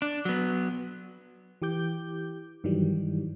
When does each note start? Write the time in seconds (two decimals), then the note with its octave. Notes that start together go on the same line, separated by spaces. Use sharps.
0.02 D4
0.25 F#3 B3
1.62 E3 G4 D6 G6
2.64 G2 D#3 E3 F#3 G3